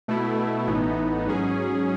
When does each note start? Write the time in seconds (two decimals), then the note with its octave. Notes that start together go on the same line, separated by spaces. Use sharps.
0.08 B2 A3 E4
0.67 A1 A2 E3 B3 D#4
1.27 G#2 F#3 C#4 G#4